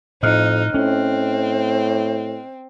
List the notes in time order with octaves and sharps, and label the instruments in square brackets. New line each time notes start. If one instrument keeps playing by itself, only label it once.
[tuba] F2 [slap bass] A2 [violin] D#4 [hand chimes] D#5 F6 F#6
[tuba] A2 [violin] C4 [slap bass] C#4